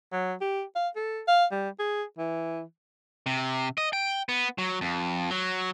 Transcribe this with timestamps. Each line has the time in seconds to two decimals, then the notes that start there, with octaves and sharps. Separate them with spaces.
0.12 F#3
0.41 G4
0.76 F5
0.96 A4
1.28 F5
1.51 G3
1.79 G#4
2.18 E3
3.26 C3
3.78 D#5
3.93 G5
4.29 B3
4.58 F#3
4.81 F2
5.31 F#3